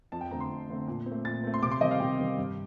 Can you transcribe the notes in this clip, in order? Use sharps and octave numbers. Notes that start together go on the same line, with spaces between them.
F2 A5
G5
D3 A3 C4 A#5
C6
F2
D3 A3 C4
A#2
C4
A3
A#2 A6
A3 C4
C6
C3 D6
C6
D#3 G3 C4 D#5
F5
C3 G5
D#3 G3 C4
G2